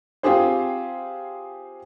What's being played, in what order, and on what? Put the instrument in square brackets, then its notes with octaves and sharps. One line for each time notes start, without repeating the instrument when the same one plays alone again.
[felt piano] C4 F4 G4 G#4 C5